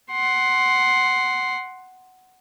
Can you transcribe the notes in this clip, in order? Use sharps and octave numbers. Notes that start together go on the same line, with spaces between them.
F#5 C6